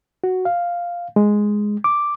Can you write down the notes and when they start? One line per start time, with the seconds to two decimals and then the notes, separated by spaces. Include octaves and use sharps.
0.24 F#4
0.45 F5
1.16 G#3
1.84 D6